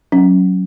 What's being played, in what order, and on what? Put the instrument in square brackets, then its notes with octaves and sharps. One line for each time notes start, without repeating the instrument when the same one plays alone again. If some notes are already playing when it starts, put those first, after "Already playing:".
[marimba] F#3 [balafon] C#4